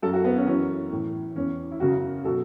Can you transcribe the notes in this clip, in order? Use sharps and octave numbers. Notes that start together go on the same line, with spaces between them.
F#2 F#3 A4
F#4
B3
C#4
F#2 E3 C#4
A2 E3
E2 E3 C#4
E4
F#2 C#3 F#3 F#4
B2 F#3 A4